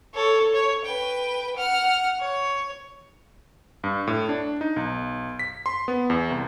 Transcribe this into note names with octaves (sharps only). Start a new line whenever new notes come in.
A4 C#5
C#5
B4 G5
F#5 F6
C#5
G2
A2
D4
D#4
B1
B6
C6
B3
E2
C2